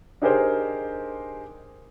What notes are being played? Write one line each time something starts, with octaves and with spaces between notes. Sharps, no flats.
D4 D#4 G4 G#4 A#4 C5